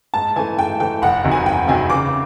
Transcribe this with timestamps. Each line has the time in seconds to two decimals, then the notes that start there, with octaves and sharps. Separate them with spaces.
0.14 G#2 A5
0.36 E3 A3 G#5
0.57 G#2 G5
0.80 E3 A3 G5
1.02 F1 F#5
1.24 E2 C3 D#3 F#3
1.32 G#5
1.46 F1 G5
1.68 E2 C3 D#3 F#3 G#5
1.90 C#3 D6